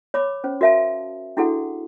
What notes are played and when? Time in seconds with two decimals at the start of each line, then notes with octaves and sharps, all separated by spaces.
0.14 C#5 B5 D6
0.44 C#4 C5
0.61 F#4 A#4 E5 F5 A5
1.37 D4 E4 F#4 G#4 A4 F#5